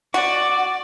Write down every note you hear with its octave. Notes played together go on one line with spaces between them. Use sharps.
F#4 D5